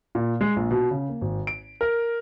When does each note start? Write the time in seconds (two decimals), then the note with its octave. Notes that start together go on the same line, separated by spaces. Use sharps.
0.15 A#2
0.41 G#3
0.56 A#1
0.71 B2
0.91 C#3
1.09 A#3
1.22 G#1
1.47 D7
1.81 A#4